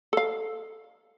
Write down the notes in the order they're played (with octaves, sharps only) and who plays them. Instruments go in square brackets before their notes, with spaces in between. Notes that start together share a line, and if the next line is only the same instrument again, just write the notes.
[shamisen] A4 F5